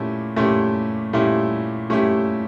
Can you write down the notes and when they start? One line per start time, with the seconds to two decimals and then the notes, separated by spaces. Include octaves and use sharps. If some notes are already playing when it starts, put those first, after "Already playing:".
Already playing: A#2 A3 C#4 E4 G4
0.36 A#2 A3 C#4 E4 G4
1.13 A#2 A3 C#4 E4 G4
1.90 A#2 A3 C#4 E4 G4